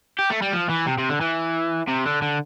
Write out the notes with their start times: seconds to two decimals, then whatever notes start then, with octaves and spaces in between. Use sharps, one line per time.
0.19 G4
0.31 A3
0.42 G3
0.53 F3
0.70 E3
0.87 C3
0.98 C3
1.09 D3
1.21 E3
1.88 C3
2.06 D3
2.22 D3